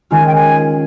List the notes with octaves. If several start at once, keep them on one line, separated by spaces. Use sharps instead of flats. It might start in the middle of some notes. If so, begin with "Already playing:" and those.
D#3 G#3 C#4 F4 G#5
G5
G#5